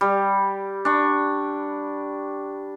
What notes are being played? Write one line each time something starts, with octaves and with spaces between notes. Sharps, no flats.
G3
D4 C#6